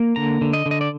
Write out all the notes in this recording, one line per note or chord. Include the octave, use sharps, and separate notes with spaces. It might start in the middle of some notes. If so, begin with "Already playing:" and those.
Already playing: A#3
D3 A#5
D3
D#5
D3
D#5
D5